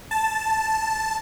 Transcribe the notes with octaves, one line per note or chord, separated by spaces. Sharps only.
A5